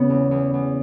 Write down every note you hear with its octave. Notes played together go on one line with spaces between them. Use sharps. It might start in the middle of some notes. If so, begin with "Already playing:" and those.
Already playing: C#3 B3 C#4
E2
E2
E2